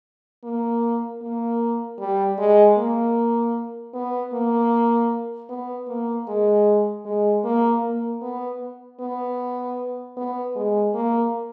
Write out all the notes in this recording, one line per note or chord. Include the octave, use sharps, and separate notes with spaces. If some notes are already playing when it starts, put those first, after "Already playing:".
A#3
A#3
G3
G#3
A#3
B3
A#3
B3
A#3
G#3
G#3
A#3
A#3
B3
B3
B3
G#3
A#3